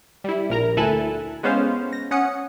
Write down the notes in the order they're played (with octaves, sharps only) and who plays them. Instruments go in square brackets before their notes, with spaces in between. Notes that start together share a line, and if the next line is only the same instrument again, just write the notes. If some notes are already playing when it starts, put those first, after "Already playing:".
[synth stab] G3 E4
A#1 A#4 A#5
D2 E4 A4 G#5 F#6 E7
G#3 B3 C#4 C5 F5
A#6
C#4 F#5 D#6 C#7